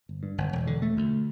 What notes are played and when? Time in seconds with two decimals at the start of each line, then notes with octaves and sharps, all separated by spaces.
0.09 G1
0.23 G2
0.38 G1
0.53 E1
0.67 D3
0.82 A3
0.97 D2